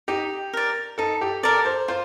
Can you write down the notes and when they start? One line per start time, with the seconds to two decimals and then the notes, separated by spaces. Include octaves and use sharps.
0.08 D#4 G4
0.53 A#4 D5
0.98 D#4 A4
1.21 G4
1.43 A4 A#4 D5
1.65 C5
1.88 F4 C5